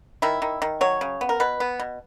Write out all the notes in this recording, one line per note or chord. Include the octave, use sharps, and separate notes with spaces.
D#3 E4
D#3
D#3
F#3 C#5
C#3
B3
A#4
B2 B4
B3
B2